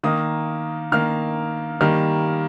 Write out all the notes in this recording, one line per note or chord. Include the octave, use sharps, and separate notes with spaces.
D#3 A#3 D#6
D#3 A#3 F6
D#3 G3 A#3 F6